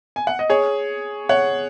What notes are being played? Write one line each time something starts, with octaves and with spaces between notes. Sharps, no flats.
G#5
F#5
D#5
G#4 C#5
C#5 F#5